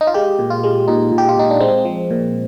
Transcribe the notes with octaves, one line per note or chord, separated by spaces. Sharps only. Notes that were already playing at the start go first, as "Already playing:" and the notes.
D#4
F4
G#3 G4
A#2
F4
G#3
A#2 D#4
A#2
G4
F4
A#2 D#4
D4
G#3 C4
F3
A#2